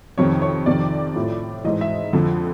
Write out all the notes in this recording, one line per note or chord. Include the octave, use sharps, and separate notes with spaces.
F2 C3 D#3 C#5
C#5
F2 C3 D#3 D5
A2 F3
G#2 E3 D#5
E5
F2 D3 F3